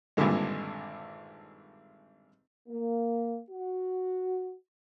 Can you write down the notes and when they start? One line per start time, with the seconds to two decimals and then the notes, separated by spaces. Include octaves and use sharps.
0.17 G#1 G2 A#2 D3 G#3
2.69 A#3
3.50 F#4